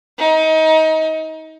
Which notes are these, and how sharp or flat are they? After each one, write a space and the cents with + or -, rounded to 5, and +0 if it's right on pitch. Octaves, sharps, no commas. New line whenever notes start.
D#4 +30